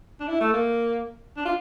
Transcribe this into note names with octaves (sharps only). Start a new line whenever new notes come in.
D4
E4
A3
A#3
D4
F4